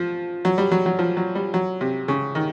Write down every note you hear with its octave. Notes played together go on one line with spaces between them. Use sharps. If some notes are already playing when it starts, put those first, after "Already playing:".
Already playing: F3
F#3
G3
F#3
F#3
F3
F#3
G3
F#3
C3
C#3
D#3